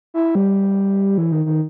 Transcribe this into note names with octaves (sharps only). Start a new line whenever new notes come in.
E4
G3
E3
D#3
D#3